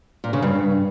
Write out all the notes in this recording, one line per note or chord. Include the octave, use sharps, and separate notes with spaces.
A#2
C#3
G2